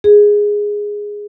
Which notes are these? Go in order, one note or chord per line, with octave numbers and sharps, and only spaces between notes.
G#4